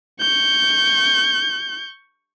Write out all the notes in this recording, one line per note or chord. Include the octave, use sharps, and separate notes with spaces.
C#6 G6